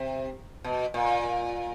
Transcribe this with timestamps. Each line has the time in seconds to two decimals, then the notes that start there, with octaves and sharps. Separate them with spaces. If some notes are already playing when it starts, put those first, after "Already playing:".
Already playing: C3
0.64 B2
0.94 A#2